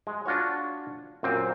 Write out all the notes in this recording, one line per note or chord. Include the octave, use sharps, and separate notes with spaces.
G#3
D4 F4 F#4 C#5
F#2 A#2 C4